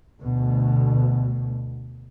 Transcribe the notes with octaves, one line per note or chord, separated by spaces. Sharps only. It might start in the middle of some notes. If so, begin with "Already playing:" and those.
D2 B2